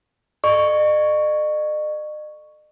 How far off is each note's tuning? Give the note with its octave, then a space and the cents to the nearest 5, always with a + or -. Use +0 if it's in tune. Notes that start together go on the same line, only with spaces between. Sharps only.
A4 +0 D#5 -45 C#6 +0